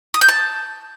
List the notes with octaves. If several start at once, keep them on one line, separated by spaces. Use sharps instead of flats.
D#6
G6
A5